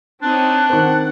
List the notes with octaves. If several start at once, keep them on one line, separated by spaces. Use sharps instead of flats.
C4 D4 D#4 C#5 F#6
D#3 C4 F#5